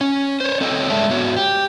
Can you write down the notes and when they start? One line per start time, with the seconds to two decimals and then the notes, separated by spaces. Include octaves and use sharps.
0.01 C#4 C#5
0.40 C5 C#5
0.61 C4 A4 C#5 D#5
0.90 G2 G#3 A4 D5 E5 A5
1.09 G#2 B3 F#4 C#5
1.37 G4